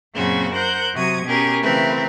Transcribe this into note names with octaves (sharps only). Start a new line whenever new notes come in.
F#2 A#2 C#3 F#3 C4 F#4
A#4 C5 F#5 F#6 G6
C3 F#3 F#4 D#6 G#6
B2 C#4 G4 G#4 A#4
C#3 E3 A3 C4 A#4 B4